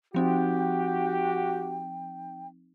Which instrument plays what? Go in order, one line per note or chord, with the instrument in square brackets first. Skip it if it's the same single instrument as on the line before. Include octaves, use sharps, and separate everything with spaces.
[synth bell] F3 C4 D#4 [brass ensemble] F#4 G4 [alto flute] G5